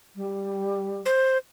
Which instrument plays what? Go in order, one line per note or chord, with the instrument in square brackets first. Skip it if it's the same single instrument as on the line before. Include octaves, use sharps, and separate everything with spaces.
[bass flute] G3
[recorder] C5